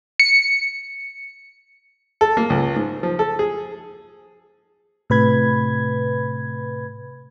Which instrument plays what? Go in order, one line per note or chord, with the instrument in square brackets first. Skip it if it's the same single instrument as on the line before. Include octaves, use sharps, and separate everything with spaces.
[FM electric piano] C#7
[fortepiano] A4
A#3
C#2
G#2
F3
A4
G#4
[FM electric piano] A2 C3 B4 B5 G#6